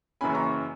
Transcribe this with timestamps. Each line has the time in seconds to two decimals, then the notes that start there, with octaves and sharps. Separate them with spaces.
0.21 F#1 F#2 E3 A#3 C#4 G#5 B5
0.35 A#5 C#6